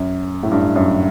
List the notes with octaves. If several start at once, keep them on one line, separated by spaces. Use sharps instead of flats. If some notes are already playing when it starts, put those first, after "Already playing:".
Already playing: F#2
A2
G2
F#2